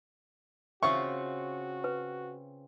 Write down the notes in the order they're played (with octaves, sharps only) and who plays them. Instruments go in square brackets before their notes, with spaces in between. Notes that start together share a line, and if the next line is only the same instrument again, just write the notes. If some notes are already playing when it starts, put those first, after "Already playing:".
[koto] C#3 C4 F4 [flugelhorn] F#4 [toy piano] E5 [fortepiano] C#6
[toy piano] B4